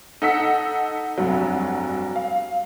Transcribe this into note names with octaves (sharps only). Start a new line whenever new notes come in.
D#4 A4 F#5 E6 B6 C#7
F1 G2 F#3
F5